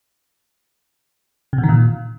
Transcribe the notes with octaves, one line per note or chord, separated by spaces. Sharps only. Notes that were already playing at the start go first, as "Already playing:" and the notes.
C3
B2
D#3
A#2